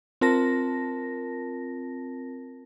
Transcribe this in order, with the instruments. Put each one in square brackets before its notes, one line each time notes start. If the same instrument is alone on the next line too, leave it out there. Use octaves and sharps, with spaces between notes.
[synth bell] C4 F4 A#4 A5 A#6